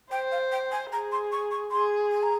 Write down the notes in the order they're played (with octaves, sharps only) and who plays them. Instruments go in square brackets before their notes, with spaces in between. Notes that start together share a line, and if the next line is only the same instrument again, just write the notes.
[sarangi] C5 [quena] G5
[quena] F5
G5
G#5
[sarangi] G#4 [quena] A#5
[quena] C6
C#6
C#6
[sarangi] G#4 [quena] C6
[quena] G#5
A#5